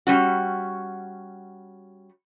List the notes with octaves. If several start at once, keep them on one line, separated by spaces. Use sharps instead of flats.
G3 C#4 F#4